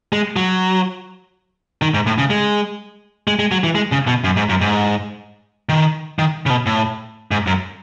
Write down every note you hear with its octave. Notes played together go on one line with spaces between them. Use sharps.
G#3
F#3
D#3
G#2
A2
C#3
G#3
G#3
G#3
F#3
E3
G#3
C#3
B2
F#2
G#2
F#2
G#2
D#3
D#3
C#3
B2
A2
G#2
F#2